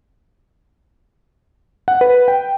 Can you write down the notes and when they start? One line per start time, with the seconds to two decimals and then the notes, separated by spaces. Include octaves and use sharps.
1.88 F#5
2.01 B4
2.28 G5